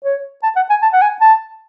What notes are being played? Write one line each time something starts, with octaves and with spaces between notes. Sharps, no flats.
C#5
A5
F#5
G#5
A5
F#5
G#5
A5